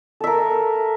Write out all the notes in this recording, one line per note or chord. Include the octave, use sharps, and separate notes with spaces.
A4 A#4 E5